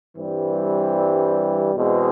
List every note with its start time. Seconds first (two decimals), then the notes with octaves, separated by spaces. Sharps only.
0.17 G2 E3 G3 C4
1.75 E2 B2 G#3 C4